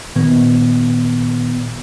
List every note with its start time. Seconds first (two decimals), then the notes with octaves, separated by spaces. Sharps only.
0.16 A#2 D#3 B3